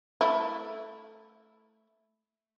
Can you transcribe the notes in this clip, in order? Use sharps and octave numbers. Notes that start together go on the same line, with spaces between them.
A3 E4